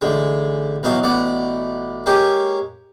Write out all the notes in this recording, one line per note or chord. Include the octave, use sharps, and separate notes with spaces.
A1 D3 G#3
B1 E2 F#3 D#5 F5
A1 B2 D5 F#5
G#3 A#3 C#4 G4